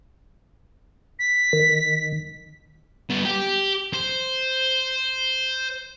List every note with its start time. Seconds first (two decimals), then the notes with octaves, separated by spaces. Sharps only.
1.19 B6
1.53 D#3
3.10 G2 B3
3.25 G4
3.93 C5